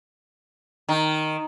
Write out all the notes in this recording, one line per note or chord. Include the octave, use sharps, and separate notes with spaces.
D#3